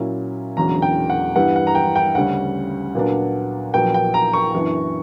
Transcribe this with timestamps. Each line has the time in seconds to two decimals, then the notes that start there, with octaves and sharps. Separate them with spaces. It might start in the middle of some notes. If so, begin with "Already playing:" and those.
Already playing: A#2 F#3 C#4 E4
0.56 E1 E2 D3 F#3 C#4 A#5
0.82 G5
1.10 F#5
1.36 G2 E3 G3 B3 E4 F#5
1.56 F#5
1.67 A#5
1.75 G5
1.96 G5
2.15 D2 C#3 G3 C#4 F#5
2.95 A#2 F#3 B3 D4
3.74 A#1 A#2 F#3 B3 G5
3.94 G5
4.14 A#5
4.33 C#6
4.54 F#2 E3 B3 D4